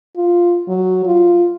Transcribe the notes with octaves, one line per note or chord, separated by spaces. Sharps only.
F4
F#3
F4